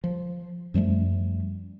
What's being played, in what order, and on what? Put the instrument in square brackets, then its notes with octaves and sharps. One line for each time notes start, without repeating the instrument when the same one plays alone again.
[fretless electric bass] F3
F#2 F3 G3 A3